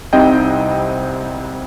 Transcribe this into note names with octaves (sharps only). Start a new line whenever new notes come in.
C2 C3 G3 C4 D#4 D#5 G5